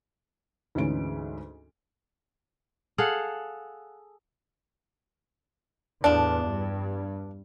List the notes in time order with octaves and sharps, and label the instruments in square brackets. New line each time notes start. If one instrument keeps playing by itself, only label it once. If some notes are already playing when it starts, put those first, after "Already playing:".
[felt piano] D2 G#2 E3 C#4 D7
[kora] G#4 A4 F5 F#5
[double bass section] E2 A2 [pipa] F3 D4
[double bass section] G2